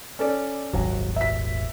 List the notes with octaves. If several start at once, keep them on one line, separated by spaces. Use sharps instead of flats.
C#4 A4 D5
D#1 G#1 F#3
E5 B6